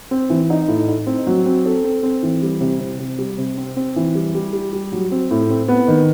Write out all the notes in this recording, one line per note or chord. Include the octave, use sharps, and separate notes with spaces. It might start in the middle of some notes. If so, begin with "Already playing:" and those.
C4
E3
D#4
A2
D#4
C4
F#3
C4
A4
C4
C4
E3
G3
C3
C3
C3
G3
C3
C4
C4
E3
G3
G3
G3
G3
F#3
C4
A2
C4
B3
D#3